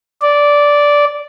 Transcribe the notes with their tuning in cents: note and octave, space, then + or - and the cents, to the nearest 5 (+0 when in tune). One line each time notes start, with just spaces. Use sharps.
D5 -10